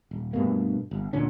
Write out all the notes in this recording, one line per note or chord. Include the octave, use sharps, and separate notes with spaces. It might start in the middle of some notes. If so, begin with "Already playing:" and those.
D#1
G2 B2 A3 A#3
G1
D2 A#2 D3 C#4